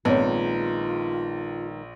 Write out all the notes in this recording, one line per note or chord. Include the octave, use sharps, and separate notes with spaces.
A#1 D#3 G#3 B3 C4 F4 C#5